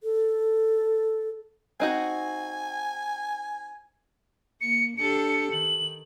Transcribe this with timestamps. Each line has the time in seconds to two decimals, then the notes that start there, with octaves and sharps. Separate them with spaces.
0.03 A4
1.80 C4 D#4 F#4 G#5
4.61 A#3 C#7
4.97 D4 G4 A4 C#7
5.52 D#3 F#7